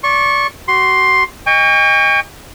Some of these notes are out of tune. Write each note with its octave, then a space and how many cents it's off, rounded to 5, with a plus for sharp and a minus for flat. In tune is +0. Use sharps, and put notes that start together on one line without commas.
D5 -25 C#6 -25
F#4 +30 C6 +5
D#5 +0 G5 +45 C#6 +25